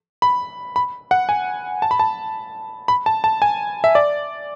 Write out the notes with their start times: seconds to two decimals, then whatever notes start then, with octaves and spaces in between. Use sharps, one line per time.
0.22 B5
0.76 B5
1.11 F#5
1.29 G#5
1.82 A5
1.91 B5
1.99 A5
2.88 B5
3.06 A5
3.24 A5
3.42 G#5
3.84 E5
3.95 D5